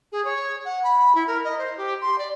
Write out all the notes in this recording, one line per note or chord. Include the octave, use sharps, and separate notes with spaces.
G#4
C#5
F#5
B5
E4
A#4
D#5
C5
G4
C6
D5